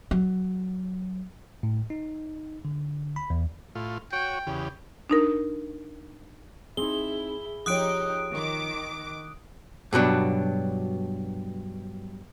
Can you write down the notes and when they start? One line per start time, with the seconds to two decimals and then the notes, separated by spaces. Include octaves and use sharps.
0.11 F#3
1.63 A2
1.90 D#4
2.65 D3
3.16 B5
3.30 E2
3.75 A2 F4
4.13 F#4 C#5 G5
4.47 E2 C#3 G4
5.10 D4 D#4 A#4
6.77 C4 D#4 E4 G#4 G7
7.66 F3 D#4 G4 C#5 D#6 F#6 D7
8.32 D#3 D6
9.93 G2 B2 F#3 D4